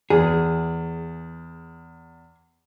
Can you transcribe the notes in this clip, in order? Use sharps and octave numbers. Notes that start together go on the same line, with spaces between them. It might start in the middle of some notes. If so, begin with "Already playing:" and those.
E2 G#4